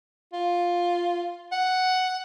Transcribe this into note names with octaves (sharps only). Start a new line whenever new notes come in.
F4
F#5